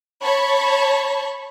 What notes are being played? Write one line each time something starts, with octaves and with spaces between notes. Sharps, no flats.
C#5 A5 B5 C#6